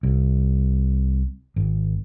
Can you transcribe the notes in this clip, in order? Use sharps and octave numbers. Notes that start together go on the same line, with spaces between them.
C2
G#1